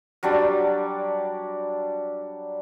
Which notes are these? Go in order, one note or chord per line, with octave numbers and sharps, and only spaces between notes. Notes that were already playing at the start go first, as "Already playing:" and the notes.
F#3 G3 D4 D5